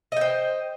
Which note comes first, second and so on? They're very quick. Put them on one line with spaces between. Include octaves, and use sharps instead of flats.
D#5 G5 C5